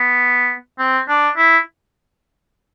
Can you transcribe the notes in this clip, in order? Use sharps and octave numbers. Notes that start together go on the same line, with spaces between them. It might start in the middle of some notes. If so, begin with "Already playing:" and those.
Already playing: B3
C4
D4
E4